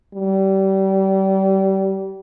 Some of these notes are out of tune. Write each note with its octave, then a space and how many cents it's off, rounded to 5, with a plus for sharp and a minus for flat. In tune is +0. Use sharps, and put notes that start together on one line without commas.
G3 -30